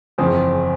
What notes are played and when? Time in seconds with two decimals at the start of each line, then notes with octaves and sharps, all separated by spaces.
0.18 F#1 E2 C#3 F3 C4